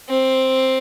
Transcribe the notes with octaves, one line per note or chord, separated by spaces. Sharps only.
C4